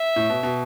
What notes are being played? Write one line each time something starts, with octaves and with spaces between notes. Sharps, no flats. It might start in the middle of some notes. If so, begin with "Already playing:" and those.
Already playing: E5
A2
B2
B2